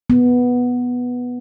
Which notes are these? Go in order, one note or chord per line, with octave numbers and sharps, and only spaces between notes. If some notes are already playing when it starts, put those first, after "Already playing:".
B3